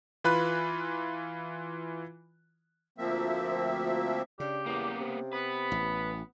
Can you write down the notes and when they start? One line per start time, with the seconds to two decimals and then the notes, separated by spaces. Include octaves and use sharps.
0.24 E3 F4 B4 B5 F#6
2.98 D2 F3 A#3 C4 E5
4.40 C#3 D4 G4
4.66 E2 A#3 B3
5.00 C3
5.33 B3 B4
5.72 A1